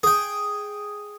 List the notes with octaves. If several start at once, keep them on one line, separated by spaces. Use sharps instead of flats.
G#4 G5